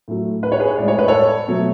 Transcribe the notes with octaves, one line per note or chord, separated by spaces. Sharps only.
A2 F#3 A3
B4
C#5
G#4 B4
A2 G#3 D5
C#5
B4
A4 C#5
B2 F#3 A3